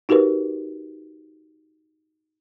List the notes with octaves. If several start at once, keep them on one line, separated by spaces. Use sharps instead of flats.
D#4 F#4 G4 A#4 B4